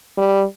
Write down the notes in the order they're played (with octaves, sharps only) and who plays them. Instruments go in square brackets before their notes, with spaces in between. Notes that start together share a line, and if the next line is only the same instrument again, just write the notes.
[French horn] G3